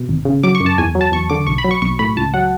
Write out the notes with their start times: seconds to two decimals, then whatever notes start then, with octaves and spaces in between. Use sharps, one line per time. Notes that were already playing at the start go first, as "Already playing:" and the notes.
Already playing: B2
0.09 G#1
0.25 C#3
0.43 F#3 D6
0.55 C#6
0.60 F#2
0.66 A5
0.78 E2 G#5
0.95 F#3
1.01 A5
1.12 E2 C#6
1.30 D3 D6
1.47 B1 C#6
1.58 B5
1.65 F#3
1.71 C#6
1.82 B1 C#6
1.99 A2 B5
2.17 C#2 A5
2.34 F#3 F#5